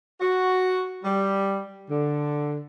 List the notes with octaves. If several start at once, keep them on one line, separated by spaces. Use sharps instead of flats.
F#4
G3
D3